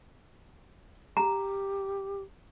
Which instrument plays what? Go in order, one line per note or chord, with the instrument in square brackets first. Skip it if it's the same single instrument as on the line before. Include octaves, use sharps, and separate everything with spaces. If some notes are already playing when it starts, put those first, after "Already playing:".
[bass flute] G4 [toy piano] A#5